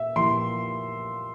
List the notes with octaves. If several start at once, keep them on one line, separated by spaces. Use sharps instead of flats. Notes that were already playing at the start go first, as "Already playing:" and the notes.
Already playing: A#2 A#3 G4 E5
A#2 F3 A#3 E4 G4 C6